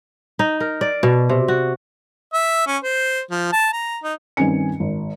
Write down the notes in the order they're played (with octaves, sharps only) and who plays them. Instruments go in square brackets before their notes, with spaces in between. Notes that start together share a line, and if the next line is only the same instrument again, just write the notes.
[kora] D#4
A#4
D5
B2
C3
F#4
[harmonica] E5
C#4
C5
F3
A5
A#5
D#4
[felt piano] G2 D#3 C4 C#4 G#5 C#7
G#1